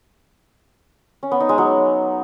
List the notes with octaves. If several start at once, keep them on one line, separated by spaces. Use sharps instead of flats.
C#4
B3
D#4
G#3
F#3